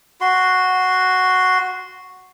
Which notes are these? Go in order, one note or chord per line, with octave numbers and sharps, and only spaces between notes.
F#4 C6